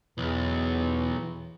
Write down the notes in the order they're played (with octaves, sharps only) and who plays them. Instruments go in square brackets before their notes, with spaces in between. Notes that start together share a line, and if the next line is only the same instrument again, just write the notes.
[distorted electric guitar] B1 [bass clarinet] E2 [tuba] E3